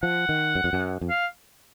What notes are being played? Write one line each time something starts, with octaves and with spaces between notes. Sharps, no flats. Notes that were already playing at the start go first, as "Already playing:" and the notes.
F3 F#5
D#3
F#2
F2
F#2
F2
F5